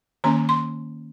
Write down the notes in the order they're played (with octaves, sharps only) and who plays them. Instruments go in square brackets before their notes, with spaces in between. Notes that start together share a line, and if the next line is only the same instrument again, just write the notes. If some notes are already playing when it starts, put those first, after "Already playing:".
[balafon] D#3 A#3 C#4 A#5
C6